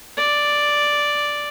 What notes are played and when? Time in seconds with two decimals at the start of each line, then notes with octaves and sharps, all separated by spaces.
0.17 D5